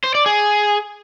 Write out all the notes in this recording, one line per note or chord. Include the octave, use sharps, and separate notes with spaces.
C5
D5
G#4